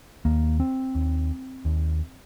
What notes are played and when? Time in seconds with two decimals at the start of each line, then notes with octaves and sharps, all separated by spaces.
0.25 D#2 A#3
0.60 C4
0.95 D#2
1.65 D#2